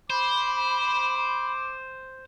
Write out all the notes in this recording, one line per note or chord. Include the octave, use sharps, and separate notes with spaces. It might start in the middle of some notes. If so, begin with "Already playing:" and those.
C5 B5 D6